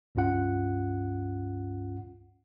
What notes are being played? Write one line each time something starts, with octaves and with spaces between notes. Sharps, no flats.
C#2 G2 C#4 F4 F#5